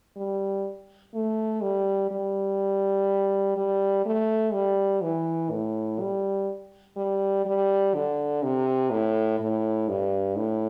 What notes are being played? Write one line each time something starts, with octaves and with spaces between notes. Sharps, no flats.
G3
A3
G3
G3
G3
A3
G3
E3
A2
G3
G3
G3
D3
C3
A2
A2
G2
A2